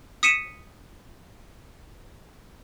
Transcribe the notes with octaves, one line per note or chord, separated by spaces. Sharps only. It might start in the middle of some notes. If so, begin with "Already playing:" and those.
D#6 B6 C#7 D#7 E7